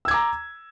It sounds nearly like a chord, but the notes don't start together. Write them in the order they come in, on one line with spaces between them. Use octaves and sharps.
E6 G#6 D6 A#5